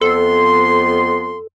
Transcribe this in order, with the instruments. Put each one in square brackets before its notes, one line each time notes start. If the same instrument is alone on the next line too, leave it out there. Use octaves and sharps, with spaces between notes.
[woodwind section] F2 B3 C6 [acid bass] A4